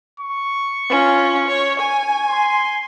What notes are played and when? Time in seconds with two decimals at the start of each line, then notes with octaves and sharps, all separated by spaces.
0.20 C#6
0.89 C#4 F4
1.48 C#5
1.79 G#5
2.28 C6